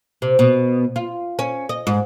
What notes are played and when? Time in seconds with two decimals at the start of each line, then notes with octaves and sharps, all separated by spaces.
0.22 C3
0.39 B2
0.96 F4
1.39 C#4
1.69 D#5
1.87 G#2